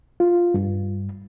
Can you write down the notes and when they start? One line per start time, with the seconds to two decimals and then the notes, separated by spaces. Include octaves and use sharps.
0.20 F4
0.54 G2